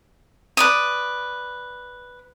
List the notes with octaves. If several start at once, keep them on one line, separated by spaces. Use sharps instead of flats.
B4 D5 D#6